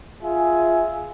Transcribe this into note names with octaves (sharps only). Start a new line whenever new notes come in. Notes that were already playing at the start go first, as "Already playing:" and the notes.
F4 G#4 E5 G#5